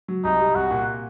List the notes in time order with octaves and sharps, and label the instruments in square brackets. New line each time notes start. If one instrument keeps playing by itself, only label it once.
[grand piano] F#3
[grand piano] C2 [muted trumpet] D#4
[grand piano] G3
[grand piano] C2 [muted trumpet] F#4
[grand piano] A#2